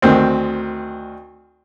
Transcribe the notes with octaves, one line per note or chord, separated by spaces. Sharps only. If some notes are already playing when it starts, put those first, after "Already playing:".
D2 D#3 C4